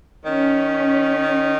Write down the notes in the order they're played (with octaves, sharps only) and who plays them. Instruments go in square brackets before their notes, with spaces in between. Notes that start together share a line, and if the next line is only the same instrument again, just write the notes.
[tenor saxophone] D#3 [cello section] C#4